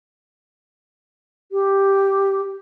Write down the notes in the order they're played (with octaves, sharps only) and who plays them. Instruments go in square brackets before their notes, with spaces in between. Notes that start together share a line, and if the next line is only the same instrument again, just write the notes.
[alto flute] G4